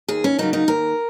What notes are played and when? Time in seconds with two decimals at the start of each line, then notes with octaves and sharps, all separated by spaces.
0.08 D#2 G#4
0.24 C#4
0.38 C#3 F#3 A#3 D#4
0.53 D#4
0.68 D#2 A#4